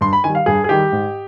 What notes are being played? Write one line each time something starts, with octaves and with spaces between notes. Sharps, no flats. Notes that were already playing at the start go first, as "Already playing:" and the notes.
G2 C6
B5
D#3 G3 G#5
F5
G2 G#4
G#4
D#3 G3 G4
G#2